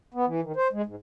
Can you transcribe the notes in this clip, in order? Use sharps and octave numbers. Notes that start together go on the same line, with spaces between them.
B3
E3
D#3
C5
G#3
G#2